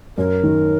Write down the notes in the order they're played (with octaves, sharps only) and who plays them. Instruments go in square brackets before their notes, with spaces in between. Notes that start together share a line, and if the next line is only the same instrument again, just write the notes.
[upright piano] F#2 [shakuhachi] A#4
[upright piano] D#3